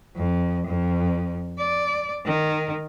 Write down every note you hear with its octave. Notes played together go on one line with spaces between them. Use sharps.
F2
F2
D5
D#3